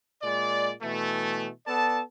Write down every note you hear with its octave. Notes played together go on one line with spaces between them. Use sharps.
A#2 G#3 D5
B2 E3 A3
B3 A4 D5 A5